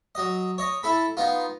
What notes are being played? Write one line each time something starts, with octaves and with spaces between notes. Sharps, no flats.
F#3 D#5
C#5 D#5
E4 A4 B5
B3 D#4 F4